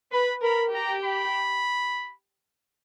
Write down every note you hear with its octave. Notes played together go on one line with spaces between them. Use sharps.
B4 B5
A#4 B5
G4 A#5
B5